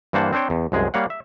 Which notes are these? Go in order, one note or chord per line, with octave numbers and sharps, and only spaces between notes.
G2 E3 A#3 C5 F#5 A5
C4 D4 C5 C#5 G5
E2
C2 F#2 G#3 G#4
G3 A#3 C#5 F5 F#5
E5